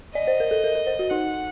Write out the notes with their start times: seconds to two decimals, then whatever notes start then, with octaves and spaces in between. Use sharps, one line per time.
0.15 D5 D#5
0.27 C5
0.40 A#4
0.51 A4
0.64 A#4
0.75 A#4
0.87 C5
0.99 F#4
1.10 D#4 F#5